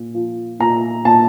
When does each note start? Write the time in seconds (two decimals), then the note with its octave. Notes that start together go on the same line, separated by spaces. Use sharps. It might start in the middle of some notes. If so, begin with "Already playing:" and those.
Already playing: A#2
0.14 F3
0.60 A#2 A#5
1.05 A#2 A5